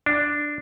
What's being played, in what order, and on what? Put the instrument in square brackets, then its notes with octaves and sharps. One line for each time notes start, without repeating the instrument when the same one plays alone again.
[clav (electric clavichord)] D4